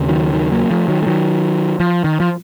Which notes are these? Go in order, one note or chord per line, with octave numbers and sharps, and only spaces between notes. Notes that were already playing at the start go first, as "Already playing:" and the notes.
Already playing: D#2 C#3
D#3 F#3
D#3 F#3
F#3 A#3
F3 A3
D#3 F#3
A3
D#3 F#3
F3
D#3
F3